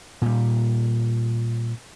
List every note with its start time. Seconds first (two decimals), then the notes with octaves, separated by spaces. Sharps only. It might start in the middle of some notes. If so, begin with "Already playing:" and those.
0.22 A#2 G3